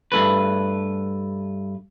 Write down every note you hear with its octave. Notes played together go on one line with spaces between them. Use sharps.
G2 A3 B4